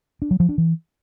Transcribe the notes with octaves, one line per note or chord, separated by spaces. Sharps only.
D4
F#3
F3
D4
E3